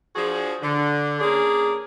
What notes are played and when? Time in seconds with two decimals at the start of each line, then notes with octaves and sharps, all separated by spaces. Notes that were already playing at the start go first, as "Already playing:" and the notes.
0.16 F3 D4 F#4 G#4
0.62 D3
1.20 A#3 C#4 D4 G#4